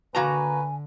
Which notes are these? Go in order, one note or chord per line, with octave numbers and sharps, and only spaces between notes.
D3 A#3 F#4 B4 G#5 A#5